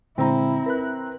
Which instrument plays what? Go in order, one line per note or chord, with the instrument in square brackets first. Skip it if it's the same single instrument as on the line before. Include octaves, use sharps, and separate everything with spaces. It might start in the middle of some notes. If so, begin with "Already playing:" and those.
[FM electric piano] A#2 D3 G#3 [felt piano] C4 A#5 [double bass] E4
[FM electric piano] A#4 B4 F#6